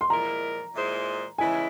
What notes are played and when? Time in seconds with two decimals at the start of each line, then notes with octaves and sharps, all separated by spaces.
0.01 C6
0.10 A#2 F3 G#3 E4 A#4 A#5
0.75 A#2 G#3 E4 G#4 C5
1.38 C#3 E3 G#3 E4 G#5